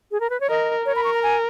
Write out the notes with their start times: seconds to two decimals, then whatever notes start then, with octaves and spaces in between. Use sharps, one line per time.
0.11 G#4
0.20 A#4
0.30 B4
0.40 C#5
0.50 A#4 D#5
0.86 A#4 C#5
0.96 B5
1.04 C#6
1.14 A#5
1.23 G#5